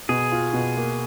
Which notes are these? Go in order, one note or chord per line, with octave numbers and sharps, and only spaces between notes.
B2 G#4
F4
B2
A#3